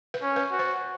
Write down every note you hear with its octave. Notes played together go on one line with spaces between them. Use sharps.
B4
C#4
B4
F#4
C5